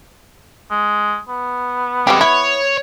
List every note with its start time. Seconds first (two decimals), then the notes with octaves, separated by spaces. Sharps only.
0.71 G#3
1.29 B3
2.07 G3 G#3 C4 G4 A4
2.21 E4 C#5